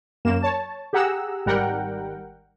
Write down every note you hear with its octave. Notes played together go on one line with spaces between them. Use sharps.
F#2 A#3 E7
C#5 A5
G4 G#4 F#5 A#5 E6
G#1 D#3 G3 A#4 F#5 G5